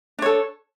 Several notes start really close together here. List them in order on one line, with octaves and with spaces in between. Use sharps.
D4 C#5 A4